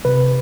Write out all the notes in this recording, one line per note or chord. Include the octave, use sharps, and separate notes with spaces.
C3 B4